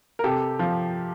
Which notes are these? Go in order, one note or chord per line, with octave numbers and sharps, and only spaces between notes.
A#4
C3 G4 A4
F3